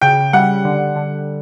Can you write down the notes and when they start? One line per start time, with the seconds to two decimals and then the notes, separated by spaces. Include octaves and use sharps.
0.01 C#3 G5
0.33 G3 F#5
0.65 D3
0.96 D3